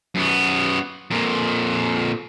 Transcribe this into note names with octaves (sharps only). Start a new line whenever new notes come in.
F#2 B3
F2 A#2